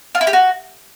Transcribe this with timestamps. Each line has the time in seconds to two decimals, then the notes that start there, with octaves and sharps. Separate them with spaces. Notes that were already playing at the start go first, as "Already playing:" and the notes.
0.15 F4
0.21 E4
0.27 G4
0.33 F#4